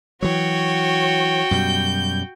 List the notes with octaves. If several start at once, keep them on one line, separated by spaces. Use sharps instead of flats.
E3 F#3 F#4 C#5 G5
F#2 B2 G3 G6